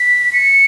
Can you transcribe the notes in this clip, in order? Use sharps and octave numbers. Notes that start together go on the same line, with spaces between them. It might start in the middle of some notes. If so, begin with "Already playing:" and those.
Already playing: B6
C#7